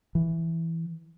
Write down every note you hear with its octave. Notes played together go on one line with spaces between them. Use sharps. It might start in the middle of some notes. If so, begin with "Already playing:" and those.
E3